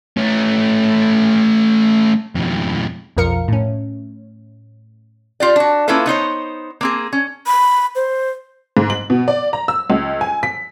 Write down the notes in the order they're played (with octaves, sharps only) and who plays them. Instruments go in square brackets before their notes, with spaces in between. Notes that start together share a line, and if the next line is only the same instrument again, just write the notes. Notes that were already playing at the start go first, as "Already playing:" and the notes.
[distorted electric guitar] A3 C#4
F2 B2
[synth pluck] B1 F2 F3 A#4 F5 C#7
A2 C#4
[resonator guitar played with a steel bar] F4 G4 D5
D4 F#4
A#3 C#4 E4 F4 A4 B4
B3 D#4 C5 C#5
A#3 C4 G#4
C#4
[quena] B5
C5
[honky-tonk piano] G#2
F#7
B2
D5
A#5
E6
C#2
G#5
B6